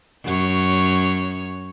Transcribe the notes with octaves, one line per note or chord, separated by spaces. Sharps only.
F#2 C#5